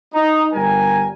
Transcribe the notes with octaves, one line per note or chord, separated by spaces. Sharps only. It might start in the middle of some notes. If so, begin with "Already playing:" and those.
D#4
G1 G3 A#4 G#5